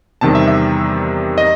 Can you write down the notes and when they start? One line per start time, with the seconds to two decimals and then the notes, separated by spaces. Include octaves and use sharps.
0.21 E2 C3 D#3 G3 C4 A5
0.35 E5
0.48 E5
1.38 D#5